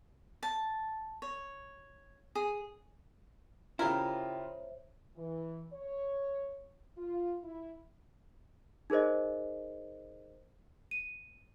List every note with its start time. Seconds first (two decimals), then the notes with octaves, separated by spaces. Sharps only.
0.43 A5
1.22 C#5
2.35 G#4
3.79 C#3 E4 F4 G4 A#4 C5 C#5 E5
5.16 E3
5.73 C#5
6.97 F4
7.43 E4
8.90 D#4 G#4 A#4 C5 D#5
10.91 D#7